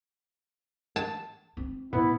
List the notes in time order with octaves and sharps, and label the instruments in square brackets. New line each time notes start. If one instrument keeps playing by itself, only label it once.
[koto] A5
[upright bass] C4
[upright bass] A2 [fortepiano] B3 [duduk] E4